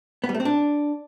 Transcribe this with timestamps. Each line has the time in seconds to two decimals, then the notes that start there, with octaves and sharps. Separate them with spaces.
0.24 B3
0.29 G3
0.34 A3
0.40 C4
0.45 D4